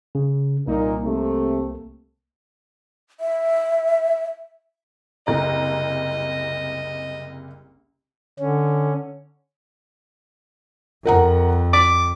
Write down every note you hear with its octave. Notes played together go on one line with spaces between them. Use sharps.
C#3
C2 A#2 A#3 D#4 A#4
C3 A3
E5
F#1 C2 D#5 A#5
D3 C#4
F2 A#4 F#5 A#5
D6 B6